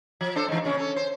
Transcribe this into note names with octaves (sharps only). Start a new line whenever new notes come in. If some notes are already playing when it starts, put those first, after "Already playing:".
F3
D4 A4 C5
G#2 E3
A#2 C#3 C#4
C#4 A4
C5